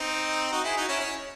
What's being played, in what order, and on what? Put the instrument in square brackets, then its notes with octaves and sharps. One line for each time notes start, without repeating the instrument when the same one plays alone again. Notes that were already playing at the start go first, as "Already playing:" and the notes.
Already playing: [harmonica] C4 D#4
D#4 F#4
E4 G#4
D#4 F#4
C#4 E4
C#4